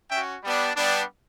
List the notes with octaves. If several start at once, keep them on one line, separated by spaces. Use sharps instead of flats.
C#4 F#4 E5 G5
G3 B3 D4
G3 B3 D4